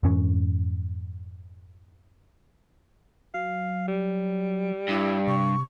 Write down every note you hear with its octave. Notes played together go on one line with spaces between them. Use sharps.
F2 G#2 E3 C#4
F#3 F5
G3
G2 E4
C3 C#6